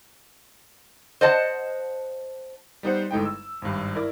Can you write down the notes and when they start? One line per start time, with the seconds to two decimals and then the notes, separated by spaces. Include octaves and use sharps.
1.21 C5 D#5 F#5 A5
2.83 G3 B3 D#4 B4 C5 F#5
3.11 G1 G#3 A3 D#4 E4 G5
3.25 E6
3.62 G#1 G2
3.95 E4 A#4 D5